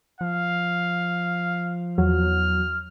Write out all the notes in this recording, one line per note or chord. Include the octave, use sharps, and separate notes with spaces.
F3 F5
E2 F#3 F6